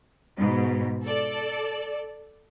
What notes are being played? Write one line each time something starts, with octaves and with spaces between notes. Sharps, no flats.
G#2 B2
A4 D5